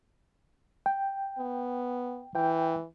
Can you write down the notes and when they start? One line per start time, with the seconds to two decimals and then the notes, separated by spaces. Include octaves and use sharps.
0.86 G5
1.38 B3
2.35 E3 G5